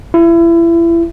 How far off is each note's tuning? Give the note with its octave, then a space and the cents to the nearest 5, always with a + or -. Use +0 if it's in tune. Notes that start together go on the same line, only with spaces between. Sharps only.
E4 +30